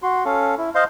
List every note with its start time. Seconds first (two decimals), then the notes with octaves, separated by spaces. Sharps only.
0.03 F#4 C6
0.25 C#4 A4 F5
0.58 E4
0.75 C5 D#5 F5 C6